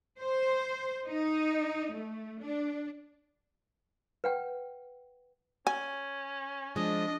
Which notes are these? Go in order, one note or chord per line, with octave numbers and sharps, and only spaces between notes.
C5
D#4
A3
D4
B4 F#5 G5
C#4 G#5
F3 G#3 D4 D#5